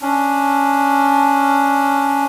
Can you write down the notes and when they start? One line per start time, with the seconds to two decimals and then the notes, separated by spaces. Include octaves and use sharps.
0.02 C#4 D4